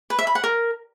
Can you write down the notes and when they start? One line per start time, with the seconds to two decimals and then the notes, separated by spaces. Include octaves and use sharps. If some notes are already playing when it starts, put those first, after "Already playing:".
0.10 B4
0.19 E5
0.27 B5
0.35 F#5
0.44 A#4